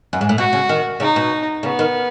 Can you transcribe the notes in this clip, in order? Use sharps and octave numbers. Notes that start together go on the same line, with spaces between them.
F#2
G#2
A2
B2 F#4
C#3
D#3
C#3 D#4
B2
C#3 B3
D#3